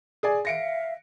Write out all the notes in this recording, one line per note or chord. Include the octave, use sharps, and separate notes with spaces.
G#4 D5 G#5
E5 F5 A#6 C#7 D7